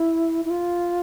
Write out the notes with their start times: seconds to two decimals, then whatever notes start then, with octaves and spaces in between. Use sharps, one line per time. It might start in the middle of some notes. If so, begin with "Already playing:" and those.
Already playing: E4
0.45 E4
0.50 F4